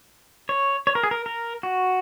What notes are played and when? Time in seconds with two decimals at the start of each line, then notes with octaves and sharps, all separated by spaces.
0.49 C#5
0.87 C#5
0.95 A#4
1.03 G#4
1.11 A#4
1.26 A#4
1.63 F#4